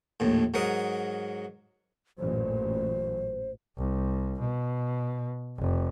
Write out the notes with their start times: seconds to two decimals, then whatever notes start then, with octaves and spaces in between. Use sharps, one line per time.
0.20 A#1 D#2 A2
0.54 G#2 F#3 A#4 F#5 D#6
2.19 A1 F#2 A#2 C5
3.78 C2
4.39 B2
5.58 F1